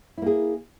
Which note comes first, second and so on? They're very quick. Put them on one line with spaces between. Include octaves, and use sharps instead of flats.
E4 A#3 G#4